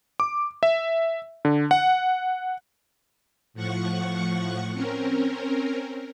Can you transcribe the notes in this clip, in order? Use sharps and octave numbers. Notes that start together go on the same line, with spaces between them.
D6
E5
D3
F#5
A2 F3 F#5 C#6
C4 C#4 A#4